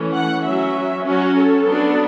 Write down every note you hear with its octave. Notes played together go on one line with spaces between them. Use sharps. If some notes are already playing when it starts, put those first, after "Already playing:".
Already playing: E3 A3 C#4
F#5
F#3 C#4 E5
F#3 C#4 F#4
A4
F#3 B3 D4